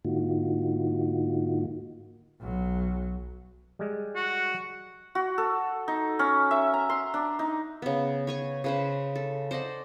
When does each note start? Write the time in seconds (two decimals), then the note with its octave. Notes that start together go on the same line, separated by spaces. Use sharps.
0.05 G#2 D3 A#3 D#4 F4 F#4
2.40 B1 F#3
3.79 G3 G#3
4.15 F#4
5.15 F#4
5.38 A4
5.88 D#4
6.19 C#4
6.51 E5
6.74 A#5
6.90 C6
7.14 D4
7.39 D#4
7.82 C#3 B3
8.27 C#5 G#5 C#6
8.64 C#3 B4 C5
9.16 A4
9.51 C5 D5 D#5 F#5